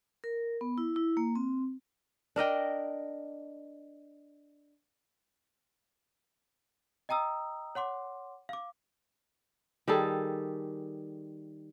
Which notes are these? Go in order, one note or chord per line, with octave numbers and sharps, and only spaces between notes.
A#4
B3
E4
E4
A#3
C4
D4 A#4 D#5 G5
D#5 G5 A#5 D#6 E6
C#5 F#5 C6 D6
F5 D6
D#3 G3 G#4 A4